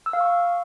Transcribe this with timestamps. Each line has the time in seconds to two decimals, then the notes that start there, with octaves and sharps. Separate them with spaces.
0.06 E6
0.13 F5
0.21 C#6